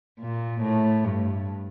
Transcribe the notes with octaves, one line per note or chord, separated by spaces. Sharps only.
A#2
A2
G2